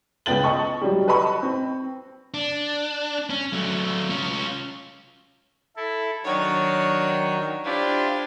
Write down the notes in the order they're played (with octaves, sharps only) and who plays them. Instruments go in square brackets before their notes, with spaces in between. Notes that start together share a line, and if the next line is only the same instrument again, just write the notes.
[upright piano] C#2 B3 G5 A6 F#7
D#5 A5 C#6
F#3 G3
B4 D#5 A5 B5 C#6
C4
[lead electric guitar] D4
C#4
F#3 A3
C#4 F4
[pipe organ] E4 A4
[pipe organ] D#3 F#3 [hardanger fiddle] D4 C#5
[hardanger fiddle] D4 C5 [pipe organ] E4 F4 G4